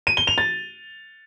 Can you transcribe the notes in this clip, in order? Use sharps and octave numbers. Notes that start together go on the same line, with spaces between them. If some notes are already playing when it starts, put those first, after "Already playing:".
D#7
G7
F7
A6